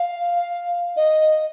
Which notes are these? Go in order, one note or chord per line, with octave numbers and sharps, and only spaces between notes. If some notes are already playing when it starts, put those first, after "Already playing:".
Already playing: F5
D#5